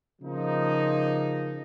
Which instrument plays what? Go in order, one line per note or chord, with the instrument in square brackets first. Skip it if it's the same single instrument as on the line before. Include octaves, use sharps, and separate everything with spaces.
[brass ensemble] C#3 F3 A#3 D#4